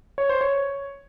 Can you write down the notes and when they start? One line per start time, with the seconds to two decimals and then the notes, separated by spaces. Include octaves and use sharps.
0.18 C#5
0.29 C5
0.41 C#5